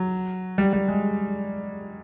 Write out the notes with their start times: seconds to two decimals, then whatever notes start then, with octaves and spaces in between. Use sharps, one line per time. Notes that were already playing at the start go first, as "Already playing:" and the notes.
Already playing: F#3
0.58 G3
0.73 G3
0.88 G#3